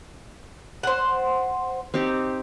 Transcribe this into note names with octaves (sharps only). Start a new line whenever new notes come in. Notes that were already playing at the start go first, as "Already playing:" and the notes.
C5 F#5
C4 D#4 G4